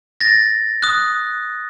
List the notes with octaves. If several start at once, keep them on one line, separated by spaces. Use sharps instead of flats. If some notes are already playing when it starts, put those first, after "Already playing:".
A6 A#6
D#6 F#6